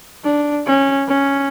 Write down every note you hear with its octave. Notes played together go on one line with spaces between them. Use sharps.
D4
C#4
C#4